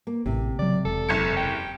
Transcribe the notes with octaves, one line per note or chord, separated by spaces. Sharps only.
A#3
A1 A2 C3
C#3 F#3 D5
E1 A4
F#1 G#6 C#7
G5